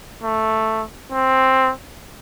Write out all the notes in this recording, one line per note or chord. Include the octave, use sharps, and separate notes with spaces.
A3
C4